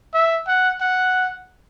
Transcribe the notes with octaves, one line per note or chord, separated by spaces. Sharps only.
E5
F#5
F#5